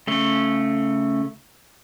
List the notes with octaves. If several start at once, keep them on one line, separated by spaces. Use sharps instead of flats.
C#3 A3